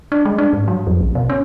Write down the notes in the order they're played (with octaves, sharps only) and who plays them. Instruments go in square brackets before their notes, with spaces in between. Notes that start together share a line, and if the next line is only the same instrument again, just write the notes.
[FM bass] D4
G#3
D4
G#2
F#3
F2
A#1
B2
C#4